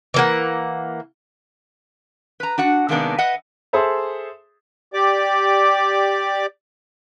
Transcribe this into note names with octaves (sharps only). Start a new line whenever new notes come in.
E3 A#3 F#5
B4 A#5
D4 F#4 F#5
C3 D#3 G#3 A#3 B3 D4
B4 D#5 E5 F#5
G#4 A4 C5 E5
G4 D5 D6